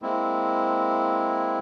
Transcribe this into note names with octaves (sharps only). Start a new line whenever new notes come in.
G#3 A#3 C4 E4